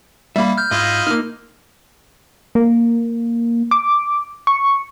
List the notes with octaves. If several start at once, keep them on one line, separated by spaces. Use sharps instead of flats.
G3 A#3 E5 B5
F6 G6
G#2 E4 F4 D#5
A#3 D#4 F6
A#3
D6
C#6